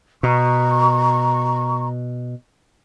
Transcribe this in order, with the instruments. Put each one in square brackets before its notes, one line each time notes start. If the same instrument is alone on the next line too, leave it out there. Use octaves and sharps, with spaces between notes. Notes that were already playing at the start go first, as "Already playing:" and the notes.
[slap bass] B2 [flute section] A#5 C#6